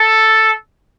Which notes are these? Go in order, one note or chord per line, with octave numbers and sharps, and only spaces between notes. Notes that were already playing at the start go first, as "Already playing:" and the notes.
Already playing: A4